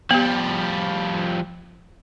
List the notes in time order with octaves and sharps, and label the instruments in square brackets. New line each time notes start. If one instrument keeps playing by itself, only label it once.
[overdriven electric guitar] F3 G3 [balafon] B3 G4